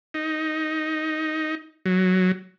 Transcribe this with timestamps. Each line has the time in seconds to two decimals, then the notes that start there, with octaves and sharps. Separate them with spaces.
0.14 D#4
1.86 F#3